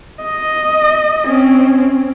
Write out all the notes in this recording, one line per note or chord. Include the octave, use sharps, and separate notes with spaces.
D#5
C4 C#4